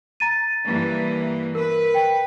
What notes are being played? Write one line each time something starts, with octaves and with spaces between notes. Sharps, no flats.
A#5 A6 D#7
G2 E3 A#3
A#4 B4
G5